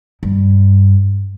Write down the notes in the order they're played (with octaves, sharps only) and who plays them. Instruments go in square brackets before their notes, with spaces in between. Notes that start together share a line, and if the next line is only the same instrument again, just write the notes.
[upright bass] G2